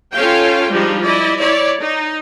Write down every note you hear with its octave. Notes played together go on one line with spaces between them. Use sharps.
C#4 F4 A4 C#5 F5 G5
F3 G3 G#3 D4 D#4
E4 D5 D#5
E4 C#5 D5
D#4